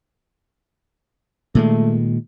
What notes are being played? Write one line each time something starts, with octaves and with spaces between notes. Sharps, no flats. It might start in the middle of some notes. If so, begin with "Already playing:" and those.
A#2 D#3 G#3 A3